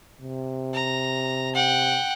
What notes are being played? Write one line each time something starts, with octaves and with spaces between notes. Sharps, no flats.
C3
A#5
F#5 G5